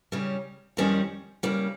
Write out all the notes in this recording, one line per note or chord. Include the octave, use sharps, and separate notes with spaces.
C#3 G3 C#4
F2 D#3 G3 C#4
C#3 G3 A#3